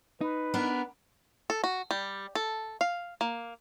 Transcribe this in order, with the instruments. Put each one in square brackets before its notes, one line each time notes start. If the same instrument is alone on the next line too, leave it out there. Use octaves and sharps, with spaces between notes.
[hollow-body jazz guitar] D#4 [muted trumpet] B4
[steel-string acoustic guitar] B3 D4 A#4
[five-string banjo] A4
F#4
G3
A4
F5
A#3